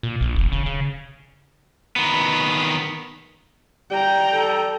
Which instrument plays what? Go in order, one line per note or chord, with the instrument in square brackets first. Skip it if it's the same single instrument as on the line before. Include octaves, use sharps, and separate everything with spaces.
[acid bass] A#2
A#1
E1
C#3
C#3
[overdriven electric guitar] D#3 B3
[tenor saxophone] G3 [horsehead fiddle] G5 A#5
[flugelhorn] A4